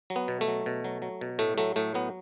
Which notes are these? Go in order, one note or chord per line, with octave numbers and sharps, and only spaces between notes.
F#3
B3
B2
A3
F#3
B2
F#3
F#3
B2
A2 A3
F#3 A3
A2 A3
F#3 B3